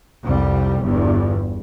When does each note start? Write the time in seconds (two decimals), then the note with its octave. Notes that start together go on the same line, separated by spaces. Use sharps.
0.23 C2 F2 G3
0.82 G1 E2 G2